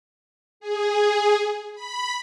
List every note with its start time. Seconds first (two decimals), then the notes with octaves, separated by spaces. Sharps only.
0.60 G#4
1.75 B5